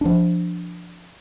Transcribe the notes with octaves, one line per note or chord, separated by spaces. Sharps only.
F3 D4